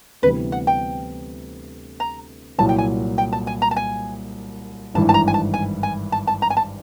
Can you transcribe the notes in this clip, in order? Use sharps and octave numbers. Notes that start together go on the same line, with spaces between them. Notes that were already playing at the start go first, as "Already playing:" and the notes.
D2 C3 E3 G3 B3 B4
F#5
G5
A#5
C2 A#2 F#3 A5
G5
G#5
G5
A5
G#5
A#5
A5
G#5
G#1 G2 E3 A5
A5
A#5
G#5
A5
G#5
G#5
A5
A5
A#5
G#5
A5